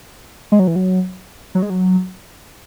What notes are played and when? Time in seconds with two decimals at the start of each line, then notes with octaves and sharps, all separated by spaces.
0.52 G#3
0.59 F#3
0.67 E3
0.76 F#3
1.55 F#3
1.62 G#3
1.70 F#3